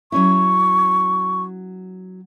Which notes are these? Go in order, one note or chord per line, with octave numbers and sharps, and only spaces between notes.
F#3 C#4 E4 C#6